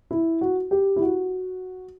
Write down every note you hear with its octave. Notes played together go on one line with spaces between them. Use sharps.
E4
F#4
G4
E4
F#4